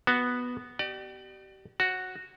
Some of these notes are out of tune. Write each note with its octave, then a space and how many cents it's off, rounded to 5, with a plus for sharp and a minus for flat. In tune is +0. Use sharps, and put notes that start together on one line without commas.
B3 +0 F#4 +0
G4 -35 D5 +30
F#4 +0 C#5 -35